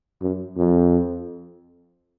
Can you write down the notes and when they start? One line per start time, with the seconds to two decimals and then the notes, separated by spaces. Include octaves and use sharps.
0.21 F#2
0.57 F2